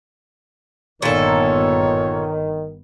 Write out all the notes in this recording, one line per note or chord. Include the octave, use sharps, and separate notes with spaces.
G1 G2 A#2 D#3 B3 A4 C#5